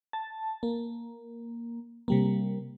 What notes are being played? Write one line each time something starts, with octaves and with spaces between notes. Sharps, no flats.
A5
A#3
C3 G3 A#3